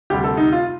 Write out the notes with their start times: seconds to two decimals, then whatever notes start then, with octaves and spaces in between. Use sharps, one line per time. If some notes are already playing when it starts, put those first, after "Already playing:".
0.10 D2 C3 G3 G4
0.24 A4
0.37 D#4
0.52 F4